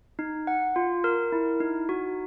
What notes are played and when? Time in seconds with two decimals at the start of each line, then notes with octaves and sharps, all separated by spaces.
0.19 D#4
0.47 F#5
0.76 F4
1.04 A#4
1.32 E4
1.60 D#4
1.89 F#4